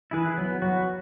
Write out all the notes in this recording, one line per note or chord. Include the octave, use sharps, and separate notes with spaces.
E3 E4 G#4 B4
F#3 B3
F#3 F#4 B4